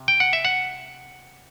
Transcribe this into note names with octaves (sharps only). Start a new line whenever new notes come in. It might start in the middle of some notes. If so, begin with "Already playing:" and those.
Already playing: C3
G5
F#5
E5
F#5